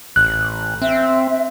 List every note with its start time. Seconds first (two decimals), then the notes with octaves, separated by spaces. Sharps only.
0.16 A1 F#6
0.81 C4 E5